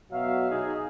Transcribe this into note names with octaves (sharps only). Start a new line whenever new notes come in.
B2 F#3 F#4 E5 F5
D#4 G#4